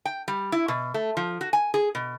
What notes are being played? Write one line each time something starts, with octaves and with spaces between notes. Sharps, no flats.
G5
G3
E4
B2
A3
F3
F#4
G#5
G#4
B2